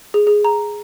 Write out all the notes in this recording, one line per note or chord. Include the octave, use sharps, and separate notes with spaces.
G#4
G#4
A#5